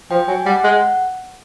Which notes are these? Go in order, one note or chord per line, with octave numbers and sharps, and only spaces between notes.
F3 G5
F#3 G#5
G3 F#5
G#3 F#5